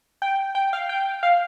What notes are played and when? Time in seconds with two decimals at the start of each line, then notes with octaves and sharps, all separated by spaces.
0.22 G5
0.55 G5
0.73 F5
0.89 G5
1.23 F5